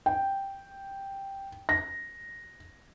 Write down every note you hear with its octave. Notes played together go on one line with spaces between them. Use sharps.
G5
A#6